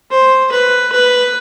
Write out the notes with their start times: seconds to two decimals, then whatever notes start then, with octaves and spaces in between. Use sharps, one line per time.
0.11 C5
0.51 B4
0.92 B4